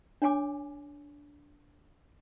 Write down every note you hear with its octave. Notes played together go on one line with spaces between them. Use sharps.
D4 C#5 G#5 D6